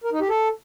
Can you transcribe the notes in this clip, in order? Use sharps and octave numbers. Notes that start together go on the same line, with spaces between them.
A#4
D#4
G4
A4